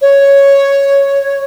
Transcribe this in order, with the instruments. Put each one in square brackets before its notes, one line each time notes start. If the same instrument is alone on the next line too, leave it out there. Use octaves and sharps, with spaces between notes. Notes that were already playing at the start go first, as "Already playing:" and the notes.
[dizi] C#5